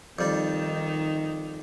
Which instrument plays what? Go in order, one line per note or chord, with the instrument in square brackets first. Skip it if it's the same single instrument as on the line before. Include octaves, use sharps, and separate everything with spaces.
[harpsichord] F2 G3 [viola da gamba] D#3 D#4